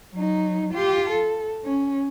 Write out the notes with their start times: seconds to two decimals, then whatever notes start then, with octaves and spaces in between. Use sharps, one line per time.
0.14 F#3 D#4
0.73 F4 G4
1.10 A4
1.65 C#4